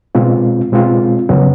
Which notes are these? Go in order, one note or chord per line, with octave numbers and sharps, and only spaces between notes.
B2 G#3 C4 F4
B2 G#3 C4 F4
F2 C#3 F#3 B3